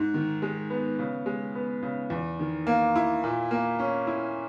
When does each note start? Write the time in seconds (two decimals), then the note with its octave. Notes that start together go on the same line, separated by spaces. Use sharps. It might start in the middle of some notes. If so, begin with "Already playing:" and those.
Already playing: G#2
0.14 D#3
0.42 G#3
0.70 B3
0.99 C#3
1.26 G#3
1.55 B3
1.83 C#3
2.10 E2
2.39 D#3
2.67 A#3
2.96 E4
3.24 A#2
3.51 A#3
3.79 C#4
4.07 E4